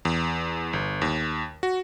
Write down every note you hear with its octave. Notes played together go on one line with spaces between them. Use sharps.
E2
G1
D#2
F#4